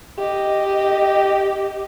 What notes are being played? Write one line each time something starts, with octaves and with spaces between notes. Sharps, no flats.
G4 D#5